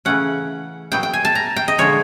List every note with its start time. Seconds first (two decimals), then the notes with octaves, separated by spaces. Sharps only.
0.05 C#3 E3 A3 C#4 F#5
0.92 A#2 F#3 B3 G5
1.03 G5
1.13 G#5
1.25 A5
1.35 A#5
1.56 G5
1.68 D#5
1.78 D3 F3 G#3 C#5